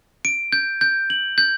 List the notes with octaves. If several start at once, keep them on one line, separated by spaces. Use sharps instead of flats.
D7
G6
G6
F#7
G6